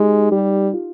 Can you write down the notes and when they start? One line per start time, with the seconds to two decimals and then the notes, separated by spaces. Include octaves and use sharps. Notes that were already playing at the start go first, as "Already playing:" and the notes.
Already playing: G#3 D#4 G4
0.32 G3 G4
0.74 F4